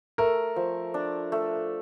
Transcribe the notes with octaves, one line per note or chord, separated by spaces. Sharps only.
A3 A#4
F3
D4
A3